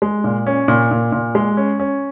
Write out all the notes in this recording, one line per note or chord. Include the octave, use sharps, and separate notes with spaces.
G#3
A#2
C#4
A#2
A#2
A#2
G#3
C#4
C#4